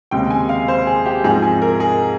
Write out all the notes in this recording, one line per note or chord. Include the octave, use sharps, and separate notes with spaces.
D#2 C#3 G#3 C4 G5
G#5
F5
C5
G#4
G4
G#2 F3 C4 D#4 G#4
G#4
A#4
G#4